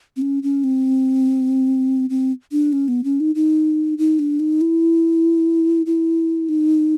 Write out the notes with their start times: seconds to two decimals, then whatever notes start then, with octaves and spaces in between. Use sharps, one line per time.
0.17 C4
0.22 C#4
0.43 C#4
0.64 C4
2.10 C4
2.52 D4
2.73 C#4
2.88 B3
3.04 C#4
3.20 D#4
3.35 D#4
3.98 D#4
4.19 D4
4.40 D#4
4.61 E4
5.86 E4
6.49 D#4